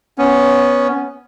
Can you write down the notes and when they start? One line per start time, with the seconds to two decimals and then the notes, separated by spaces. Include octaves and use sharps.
0.18 B3 C#4